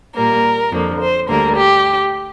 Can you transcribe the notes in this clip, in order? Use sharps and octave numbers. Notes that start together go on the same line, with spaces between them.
A#2 G3 A#3 A#4
F2 D3 F3 A#3
C5
D2 D3 G3 A#3 A#4
G4